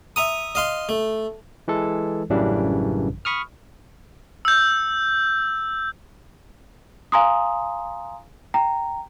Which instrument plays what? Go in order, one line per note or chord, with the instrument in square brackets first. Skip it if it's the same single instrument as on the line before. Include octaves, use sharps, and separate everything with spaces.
[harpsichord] E5 A#5 D#6
D#5 F5 C6
A3
[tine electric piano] E3 G#3 A4
A1 F#2 C#3 E3 G3 D4
B5 C#6 D#6 F6
[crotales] E6 G6
[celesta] F5 G#5 A#5 C6 D#6
G5 A#5